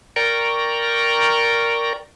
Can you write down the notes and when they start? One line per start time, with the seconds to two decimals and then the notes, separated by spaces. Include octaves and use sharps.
0.16 A#4 D5 G5 A#5 C#6